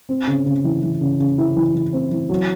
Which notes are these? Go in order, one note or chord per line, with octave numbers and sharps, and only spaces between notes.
C4
C#3
C#3
E3
E3
C#3
C#3
E4
E3
E3
C4
E3
F#3